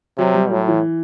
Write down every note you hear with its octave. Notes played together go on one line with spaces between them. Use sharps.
C3 F#3
G3
A2 F#3
E3